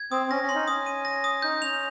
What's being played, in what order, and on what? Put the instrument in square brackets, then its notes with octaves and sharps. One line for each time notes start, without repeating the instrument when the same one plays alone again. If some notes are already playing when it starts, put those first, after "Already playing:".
Already playing: [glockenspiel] G#6
[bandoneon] C4 [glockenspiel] D#6
[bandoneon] C#4 [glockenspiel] A#6
[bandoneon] C#4
[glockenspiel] C6
[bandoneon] D#4
[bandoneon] C#4 [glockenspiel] D#6
[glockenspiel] D#7
A#6
D#6
[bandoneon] D#4 [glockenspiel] G6
[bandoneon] C#4 [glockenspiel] F7